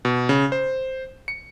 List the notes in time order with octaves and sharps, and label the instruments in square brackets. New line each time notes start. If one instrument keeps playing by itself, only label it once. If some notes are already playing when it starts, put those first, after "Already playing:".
[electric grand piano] B2
C#3
C5
C#7